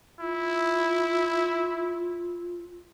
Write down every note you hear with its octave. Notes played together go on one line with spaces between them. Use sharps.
E4 F4